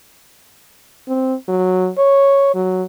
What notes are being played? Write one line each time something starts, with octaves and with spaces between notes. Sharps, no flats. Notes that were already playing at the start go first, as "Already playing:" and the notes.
C4
F#3
C#5
F#3